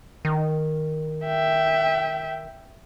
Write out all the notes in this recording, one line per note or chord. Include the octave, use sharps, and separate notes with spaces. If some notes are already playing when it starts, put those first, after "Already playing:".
D#3
E5 G5